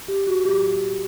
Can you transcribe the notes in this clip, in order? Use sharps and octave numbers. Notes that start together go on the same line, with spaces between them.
G4
F#4
A2 F#3 A#3 G4